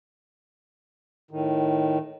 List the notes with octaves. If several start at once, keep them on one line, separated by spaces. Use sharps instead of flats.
A2 D#3